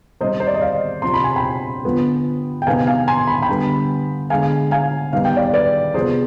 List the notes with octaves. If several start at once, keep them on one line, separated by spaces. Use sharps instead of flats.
D#3 G3 C4 C5 D#5
C5
D5
D#5
D5 F5
C3 F3 C4 C6
B5
G#5
G5 B5
D3 F3 B3
G5
C3 D#3 B3 F5 G#5
F5 G#5
G#5 C6
B5
G#5
G5 B5
D3 G3 B3
D3 G#3 B3 F5 G#5
F5 G#5
D#3 G3 B3 F5
G5
D5 F5
B4 D5
C3 F3 B3 G#4 C5